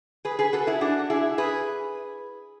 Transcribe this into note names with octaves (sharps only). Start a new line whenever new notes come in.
G#4 B4
G#4 B4
F#4 A4
E4 G#4
D4 F#4
E4 G#4
G#4 B4